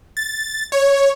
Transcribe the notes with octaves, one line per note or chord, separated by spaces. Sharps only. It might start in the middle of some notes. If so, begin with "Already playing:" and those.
A6
C#5